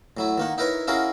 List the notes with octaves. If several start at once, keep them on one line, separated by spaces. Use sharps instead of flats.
A2 F#3 E4
D#3 A#3 F#5
D#4 E4 A#4 B4 C#5
C#4 E4 F#4 G#4 A#4 F5